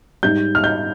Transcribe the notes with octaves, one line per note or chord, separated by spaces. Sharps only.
G#2 G3 G6
F6
G6